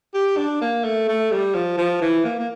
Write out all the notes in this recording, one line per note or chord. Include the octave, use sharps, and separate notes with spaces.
G4
D4
A#3
A3
A3
G3
F3
F3
E3
A#3
A#3